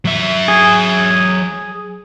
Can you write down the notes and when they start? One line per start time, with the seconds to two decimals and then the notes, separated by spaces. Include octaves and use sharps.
0.05 F#3 E5
0.48 G#4